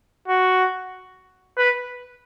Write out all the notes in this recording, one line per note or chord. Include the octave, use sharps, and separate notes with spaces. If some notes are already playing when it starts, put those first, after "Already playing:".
F#4
B4